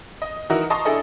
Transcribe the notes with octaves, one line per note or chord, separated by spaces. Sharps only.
D#5
E3 D#4 E4 F#4 A#4 D#5
D#5 A5 A#5 C6 C#6 D#6
D4 E4 G#4 A4 D#5